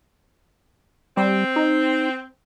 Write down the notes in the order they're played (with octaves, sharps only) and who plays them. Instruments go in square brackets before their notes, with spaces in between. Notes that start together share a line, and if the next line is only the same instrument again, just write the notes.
[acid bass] G3 [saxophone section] C4
[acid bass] D#4